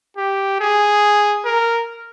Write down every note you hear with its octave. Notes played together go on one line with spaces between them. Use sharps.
G4
G#4
A#4